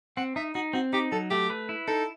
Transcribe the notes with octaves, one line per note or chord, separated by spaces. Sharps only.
C4 F#5
D#4 E5
D#4 F#4
C4 F#4
D#4 G4
F#3 A4
A3 G4
B4
E4
D#4 A4